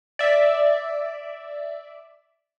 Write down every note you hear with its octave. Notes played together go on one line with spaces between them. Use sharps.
D5 E5